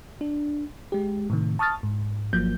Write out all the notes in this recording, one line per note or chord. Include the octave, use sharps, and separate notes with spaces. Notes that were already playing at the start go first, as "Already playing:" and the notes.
D4
G#3 G4
A2 C3 D#3
A5 C#6 D#6 F6 A6
G#2
G#1 F3 F#3 A#3 G6